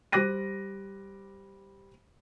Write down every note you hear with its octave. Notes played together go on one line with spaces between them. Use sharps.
G3 C5 D6 F#6 A#6 D#7